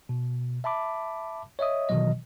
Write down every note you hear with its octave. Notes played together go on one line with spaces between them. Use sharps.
B2
E5 A5 B5 D6
C#5 D#5 E5 D#6
B2 D#3 E3 F#3 D#5